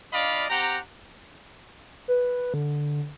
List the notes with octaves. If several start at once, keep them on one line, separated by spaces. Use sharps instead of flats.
D4 F4 D5 D#5 F5 B5
C4 G4 F#5 G5 A#5
B4
D3